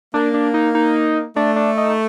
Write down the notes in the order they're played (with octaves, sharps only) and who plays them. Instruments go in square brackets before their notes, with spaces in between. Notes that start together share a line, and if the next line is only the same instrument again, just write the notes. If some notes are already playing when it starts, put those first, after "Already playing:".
[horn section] A#3 [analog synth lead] D4
[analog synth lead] D4
D#4
D#4
[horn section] A3 [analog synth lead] D4
[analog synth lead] D4
D#4